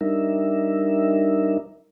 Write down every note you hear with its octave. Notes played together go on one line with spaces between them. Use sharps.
G3 D4 D#4 A#4 E5